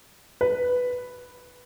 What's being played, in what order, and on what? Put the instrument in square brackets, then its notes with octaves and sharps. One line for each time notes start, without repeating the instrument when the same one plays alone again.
[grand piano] B4